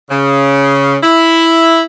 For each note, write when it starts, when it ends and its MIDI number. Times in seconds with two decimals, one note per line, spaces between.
0.10 0.97 49
1.03 1.82 64